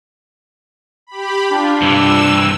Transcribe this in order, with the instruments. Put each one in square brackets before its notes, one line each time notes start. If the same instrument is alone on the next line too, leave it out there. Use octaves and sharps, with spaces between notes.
[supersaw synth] G4 B5
[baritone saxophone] D4 [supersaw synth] F4
[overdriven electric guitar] G2 E3 [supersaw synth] E6